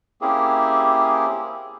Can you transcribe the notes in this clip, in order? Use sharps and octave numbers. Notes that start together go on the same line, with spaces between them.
A#3 C4 C#4 E4 G4 G#4